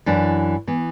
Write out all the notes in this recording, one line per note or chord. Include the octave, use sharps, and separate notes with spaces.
F#2 E3 D4
E3 B3